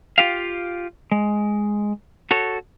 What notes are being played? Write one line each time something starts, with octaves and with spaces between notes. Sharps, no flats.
F4 G4 F5
G#3
F#4 A4 C#5